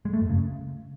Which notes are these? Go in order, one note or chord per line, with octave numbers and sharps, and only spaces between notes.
G#3
A3
F#2
C#3